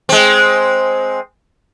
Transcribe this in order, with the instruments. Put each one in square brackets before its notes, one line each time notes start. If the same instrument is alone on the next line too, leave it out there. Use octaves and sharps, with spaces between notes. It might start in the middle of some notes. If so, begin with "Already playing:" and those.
[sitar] G#3 C4